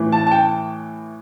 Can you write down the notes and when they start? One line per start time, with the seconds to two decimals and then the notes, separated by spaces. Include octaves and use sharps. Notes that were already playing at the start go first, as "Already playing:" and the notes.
Already playing: A2 E3
0.12 A5
0.27 A5
0.31 G5